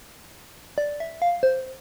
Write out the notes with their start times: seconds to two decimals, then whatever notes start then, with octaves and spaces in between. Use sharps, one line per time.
0.78 D5
1.00 E5
1.22 F5
1.43 C5